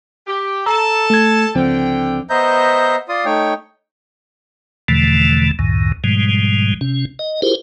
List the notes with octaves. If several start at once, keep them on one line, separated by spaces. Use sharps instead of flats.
G4
A4 A5 A#5 E6
A3 G#6
C#2 D3 F3 C4 G5
B3 C5 D#5 E5 A#5 G6
F4 D5 C6 D#6
A3 D#4 C#5 G5
E2 B2 D3 E3 F3 A3
C#2 F#2 A2 D#3
G#2 B2 F3 G3 G#3
C3 C#4
D#5
E4 F4 G4 G#4 A#4 C5